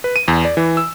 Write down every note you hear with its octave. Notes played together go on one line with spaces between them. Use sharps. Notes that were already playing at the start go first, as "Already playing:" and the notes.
B4
D#7
E2
D5
E3
E6